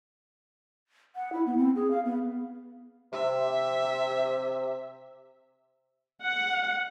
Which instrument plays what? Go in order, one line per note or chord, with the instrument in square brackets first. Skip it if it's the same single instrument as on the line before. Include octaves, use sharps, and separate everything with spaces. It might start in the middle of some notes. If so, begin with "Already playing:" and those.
[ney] F#5
E4
B3
C4
G#4
F5
B3
[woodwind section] C3 [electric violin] E5
[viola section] F#5